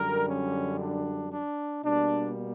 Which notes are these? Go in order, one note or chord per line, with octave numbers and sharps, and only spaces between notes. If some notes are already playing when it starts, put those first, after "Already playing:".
Already playing: F#2 D3 G3 A#4
C#4
D4
D4
B2 G3 A#3 D4